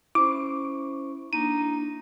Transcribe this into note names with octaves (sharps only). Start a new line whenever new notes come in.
C#4 E4 C5 C#6 D6
A#3 D4 D#4 D#7